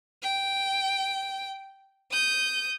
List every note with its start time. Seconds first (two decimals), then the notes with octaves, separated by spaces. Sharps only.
0.22 G5
2.11 D#6 G6